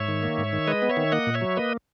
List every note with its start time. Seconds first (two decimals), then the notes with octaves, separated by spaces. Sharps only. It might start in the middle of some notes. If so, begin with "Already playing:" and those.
Already playing: G#2 C#5 E5
0.08 D#3
0.23 A#3
0.38 G#2
0.53 D#3
0.67 G#3 B4 D#5
0.82 B3
0.90 C#5 E5
0.97 D#3
1.12 A#3 D#5 F#5
1.27 A#2
1.34 C#5 E5
1.41 F#3
1.57 A#3 B4 D#5